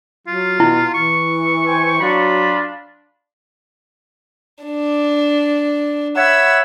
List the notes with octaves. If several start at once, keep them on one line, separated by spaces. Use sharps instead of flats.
F#3 F4
B2 E4
E3 C#6
C5 G5 G#5
F#3 D4 F4 B5
D4
C#5 E5 F#5 B5 E6